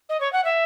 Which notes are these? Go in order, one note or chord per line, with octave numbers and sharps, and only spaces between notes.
D#5
C#5
F#5
E5